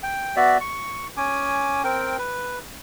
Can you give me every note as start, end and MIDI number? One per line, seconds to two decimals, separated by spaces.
0.03 0.36 79
0.36 0.58 59
0.36 0.58 66
0.36 0.58 74
0.36 0.58 76
0.60 1.07 85
1.17 1.82 61
1.17 1.82 80
1.17 1.82 86
1.84 2.17 60
1.84 2.17 70
1.84 2.17 79
2.19 2.59 71